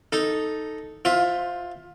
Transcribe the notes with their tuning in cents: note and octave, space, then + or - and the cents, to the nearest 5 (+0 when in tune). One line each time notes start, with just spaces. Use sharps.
D#4 +0 A4 +0
F4 +15 C5 +0 E5 +0